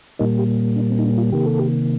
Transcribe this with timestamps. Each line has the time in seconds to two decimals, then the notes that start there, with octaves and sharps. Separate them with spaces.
0.19 A#2 G3 A#3 D#4
0.39 G4
0.76 D4
0.90 C4
0.99 D#4
1.04 D4
1.18 F4
1.32 C3 D#3 A#3 G4
1.46 A4
1.59 G4